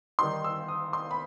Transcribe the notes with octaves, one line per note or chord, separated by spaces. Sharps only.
D#3 G3 D#4 C6
E6
D#6
C6
B5